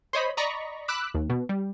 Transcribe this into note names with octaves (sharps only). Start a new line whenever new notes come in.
C5 C#5 D#5 B5
D5 D#5 A#5 B5 C#6
B5 D6 E6 F#6
D#2
B2
G3